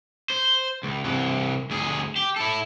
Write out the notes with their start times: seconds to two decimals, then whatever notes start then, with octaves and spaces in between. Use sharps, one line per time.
0.30 C5
0.83 C#2
1.04 C2 E3
1.70 D2 G#4
2.16 G4
2.36 E4 A4